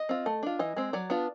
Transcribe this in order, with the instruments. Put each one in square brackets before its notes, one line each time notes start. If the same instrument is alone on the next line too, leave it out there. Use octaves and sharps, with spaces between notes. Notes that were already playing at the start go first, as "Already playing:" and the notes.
Already playing: [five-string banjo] D#5
C4 F4
A3
D4 F4
E3 D#5
G#3 C4
F#3 D5
B3 D4 F4